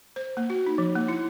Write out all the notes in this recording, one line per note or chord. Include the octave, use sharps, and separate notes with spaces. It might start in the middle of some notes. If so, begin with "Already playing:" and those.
C5
A#3
F#4
D#4
F3
A#3
E4